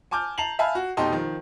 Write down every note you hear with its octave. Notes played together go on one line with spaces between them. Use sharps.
G#5 A5 D6 F6 G6
A5 A#5 C7 F7 F#7
E5 F5 G#5 A5 B5 F6
F#4
F1 B2 D#4 G4 A5 C6
D#3 F3